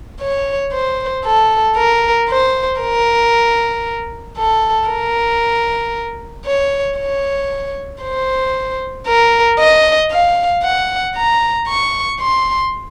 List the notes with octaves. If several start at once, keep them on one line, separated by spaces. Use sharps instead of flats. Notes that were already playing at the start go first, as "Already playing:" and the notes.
C#5
C5
A4
A#4
C5
A#4
A4
A#4
C#5
C#5
C5
A#4
D#5
F5
F#5
A#5
C#6
C6